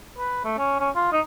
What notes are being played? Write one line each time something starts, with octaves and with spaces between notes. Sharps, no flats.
B4
A3
C#4
C#4
F4
D#4